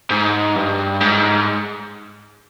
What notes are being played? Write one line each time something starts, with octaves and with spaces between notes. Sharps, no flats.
G#2
G2
G#2